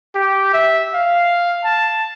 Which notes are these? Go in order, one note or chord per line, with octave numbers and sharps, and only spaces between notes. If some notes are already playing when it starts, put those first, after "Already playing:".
G4
E5
F5
A5